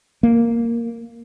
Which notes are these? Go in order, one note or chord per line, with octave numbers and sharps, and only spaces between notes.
A#3